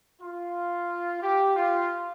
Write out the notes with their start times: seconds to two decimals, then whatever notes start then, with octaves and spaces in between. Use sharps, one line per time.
0.22 F4
1.23 G4
1.56 F4